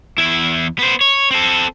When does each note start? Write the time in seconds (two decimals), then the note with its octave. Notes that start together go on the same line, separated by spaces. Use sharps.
0.18 E2 E4
0.79 B3 C5
1.01 C#5
1.31 C4 A4